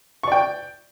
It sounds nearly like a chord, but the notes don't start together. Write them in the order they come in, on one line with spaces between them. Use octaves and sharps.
C#6 D5 G5